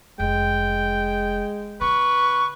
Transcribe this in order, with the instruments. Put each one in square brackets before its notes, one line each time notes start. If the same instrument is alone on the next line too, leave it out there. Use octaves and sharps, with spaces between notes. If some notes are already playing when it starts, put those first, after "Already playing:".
[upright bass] F1 [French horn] G#3 [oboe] G5
[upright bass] C#3 [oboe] B4 [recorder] C#6